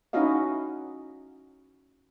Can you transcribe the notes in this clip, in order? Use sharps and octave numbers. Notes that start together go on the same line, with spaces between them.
C#4 D#4 E4 F#4 D#5 F5